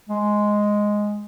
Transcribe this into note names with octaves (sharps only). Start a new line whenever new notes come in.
G#3